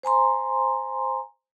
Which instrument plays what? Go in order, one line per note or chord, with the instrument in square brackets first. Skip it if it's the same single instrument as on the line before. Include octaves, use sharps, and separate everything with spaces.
[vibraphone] C5 G#5 A#5 C6